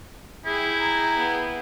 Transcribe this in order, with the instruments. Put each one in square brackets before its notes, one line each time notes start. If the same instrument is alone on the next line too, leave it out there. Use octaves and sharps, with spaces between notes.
[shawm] E4 [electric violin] G#4 G5
[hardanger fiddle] A#5
B3